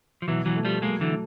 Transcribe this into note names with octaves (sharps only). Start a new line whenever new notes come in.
F3
B2 E3 F#3
E3 F#3
A3
F3 G3
F#3 G#3 A#3
D3 E3
A3